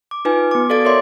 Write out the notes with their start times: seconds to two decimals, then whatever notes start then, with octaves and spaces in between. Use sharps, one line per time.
0.11 D6
0.25 D#4 F4 B4 G#5
0.51 B3 D6
0.69 F#4 A4 D5 F5 A6 D7
0.85 A#4 C#5 D5 E5 C6 D6